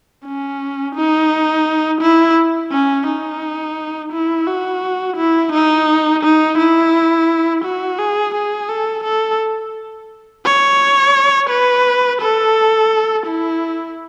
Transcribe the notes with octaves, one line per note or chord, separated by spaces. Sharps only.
C#4
D#4
E4
C#4
D#4
E4
F#4
E4
D#4
D#4
E4
F#4
G#4
G#4
A4
A4
C#5
B4
A4
E4